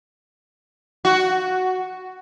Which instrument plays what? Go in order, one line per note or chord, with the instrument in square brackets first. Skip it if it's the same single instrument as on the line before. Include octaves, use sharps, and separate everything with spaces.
[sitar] F#4